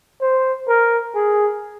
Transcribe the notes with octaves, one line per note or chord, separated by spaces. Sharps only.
C5
A#4
G#4